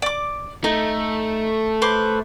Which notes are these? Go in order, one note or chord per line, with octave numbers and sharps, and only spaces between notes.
D5 D6
A3 D#4
B4 C5 D6